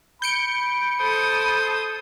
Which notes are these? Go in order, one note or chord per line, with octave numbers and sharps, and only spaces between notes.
B5 G6 C#7 D7
A4 C5 D#6